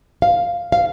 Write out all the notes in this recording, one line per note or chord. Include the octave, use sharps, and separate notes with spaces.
F5
F5